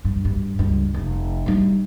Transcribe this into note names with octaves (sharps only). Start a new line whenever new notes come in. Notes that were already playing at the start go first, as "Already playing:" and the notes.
G2
G2
C#2 G2
F1
G3 D#4